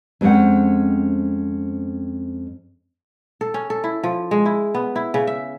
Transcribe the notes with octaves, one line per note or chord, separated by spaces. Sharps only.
F2 G#3 C4 C#4 F#5
A4
C#4
A4
E4
F3
G#3
E4
B3
E4
C#3
E5